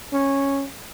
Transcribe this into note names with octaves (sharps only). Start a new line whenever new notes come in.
C#4